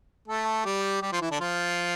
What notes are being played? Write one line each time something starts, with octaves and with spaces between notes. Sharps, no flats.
A3 A4
G3 G4
G3 G4
F3 F4
E3 E4
D3 D4
F3 F4